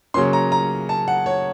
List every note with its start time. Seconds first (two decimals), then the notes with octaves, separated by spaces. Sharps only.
0.14 C#3 F#3 A#3 C#4 C6
0.33 A#5
0.52 A#5
0.89 A5
1.08 F#5
1.26 C#5